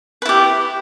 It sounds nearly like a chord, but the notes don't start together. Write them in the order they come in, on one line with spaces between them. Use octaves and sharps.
B4 E4 G4